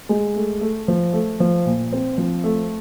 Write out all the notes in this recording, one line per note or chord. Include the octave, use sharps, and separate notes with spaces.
G#3
A3
A3
F3
A3
F3
A#2
C4
F3
A3